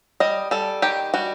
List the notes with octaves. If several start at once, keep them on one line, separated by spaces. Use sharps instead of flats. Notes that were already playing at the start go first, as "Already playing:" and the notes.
G3 D#5
G3 A4
D#3 G4
G3 F#4